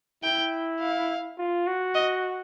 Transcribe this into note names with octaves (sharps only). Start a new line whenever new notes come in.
E4 G5
F5
F4
F#4
D#5